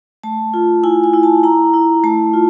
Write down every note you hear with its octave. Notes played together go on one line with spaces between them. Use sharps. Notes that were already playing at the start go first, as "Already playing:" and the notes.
A3 A5
F4
E4 G#5
G#5
E4
A5
E4 A#5
E4
A3 A5
F4